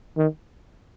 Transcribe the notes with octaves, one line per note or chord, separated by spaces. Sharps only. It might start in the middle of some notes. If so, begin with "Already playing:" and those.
D#3